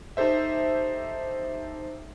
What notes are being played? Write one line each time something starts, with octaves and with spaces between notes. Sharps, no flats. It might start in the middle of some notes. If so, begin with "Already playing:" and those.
D#4 G4 A4 C5 E5